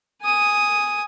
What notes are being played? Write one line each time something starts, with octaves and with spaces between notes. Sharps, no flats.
G#5 D#6